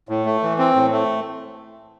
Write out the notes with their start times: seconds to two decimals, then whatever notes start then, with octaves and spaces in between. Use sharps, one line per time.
0.09 A2
0.26 A3
0.43 E3
0.59 C4
0.75 A2
0.92 A3